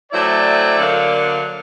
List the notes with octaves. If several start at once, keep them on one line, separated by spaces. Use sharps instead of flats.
F#3 A3 C4 E4 D5
D3 F#3 A#3